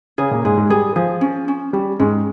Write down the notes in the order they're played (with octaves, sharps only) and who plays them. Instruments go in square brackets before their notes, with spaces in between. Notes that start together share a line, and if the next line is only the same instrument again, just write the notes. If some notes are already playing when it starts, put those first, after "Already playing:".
[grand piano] C#3 C#4 [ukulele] G#4
[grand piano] A#2 A#3
[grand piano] G#2 G#3 [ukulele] G#4
[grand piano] G#2 G#3
[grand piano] G3 [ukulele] G#4
[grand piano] F3 [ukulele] G#4
[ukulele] C#4
C#4
[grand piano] G3 [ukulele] C#4
[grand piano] G#2 G#3 [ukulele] C#4